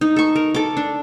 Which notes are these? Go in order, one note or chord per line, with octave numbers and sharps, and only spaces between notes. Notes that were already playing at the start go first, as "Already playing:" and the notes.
D#4
A4 C#6
A#4
A4 D6
D4